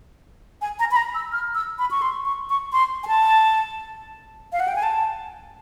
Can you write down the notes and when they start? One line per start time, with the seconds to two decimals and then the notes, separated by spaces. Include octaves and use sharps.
0.61 G#5
0.79 A#5
0.91 B5
0.96 A#5
1.15 E6
1.32 F6
1.55 E6
1.79 B5
1.91 C#6
2.02 C6
2.25 C#6
2.49 C#6
2.72 C6
3.03 G#5
3.07 A5
4.53 F5
4.60 F#5
4.68 G5
4.76 G#5
4.83 A5